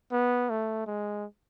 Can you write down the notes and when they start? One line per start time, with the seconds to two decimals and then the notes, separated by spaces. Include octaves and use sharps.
0.12 B3
0.50 A3
0.86 G#3